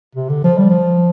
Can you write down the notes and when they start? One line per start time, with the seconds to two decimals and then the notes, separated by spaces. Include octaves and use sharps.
0.15 C3
0.29 D3
0.44 F3
0.58 G3
0.70 F3